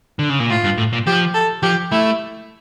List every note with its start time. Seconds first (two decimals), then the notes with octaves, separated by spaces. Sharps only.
0.19 D3
0.30 C#3
0.40 A#2
0.50 A2 F4
0.64 G2
0.77 A2
0.93 A#2
1.07 F3 G4
1.34 A4
1.63 F3 G4
1.92 A3 E4